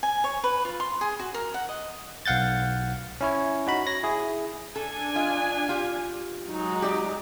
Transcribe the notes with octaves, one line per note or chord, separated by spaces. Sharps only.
G#5
C#5
B4
F4
C6
G#4
F#4
A#4
F#5
D#5
B1 F5 F#5 G6 A6
C#4 E4 C#5
D#4 F#4 B5
C#5 A#6
E4 G#4
D4 A4 G#5
F4 D#5
F4 G4
F#3 G#3 D#4
G4 D5